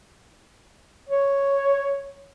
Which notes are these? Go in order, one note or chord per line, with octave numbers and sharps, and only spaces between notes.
C#5